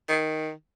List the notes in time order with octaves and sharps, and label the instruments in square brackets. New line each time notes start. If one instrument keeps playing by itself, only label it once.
[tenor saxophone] D#3